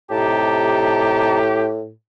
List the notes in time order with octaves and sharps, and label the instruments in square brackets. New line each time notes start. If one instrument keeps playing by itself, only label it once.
[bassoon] A2 [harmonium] C3 D#4 A5 [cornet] G4